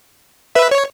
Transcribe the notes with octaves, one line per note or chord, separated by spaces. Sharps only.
B4 E5
C#5